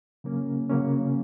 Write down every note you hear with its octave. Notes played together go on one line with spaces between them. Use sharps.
C#3 F#3 A#3 C#4
C#3 F#3 A#3 C#4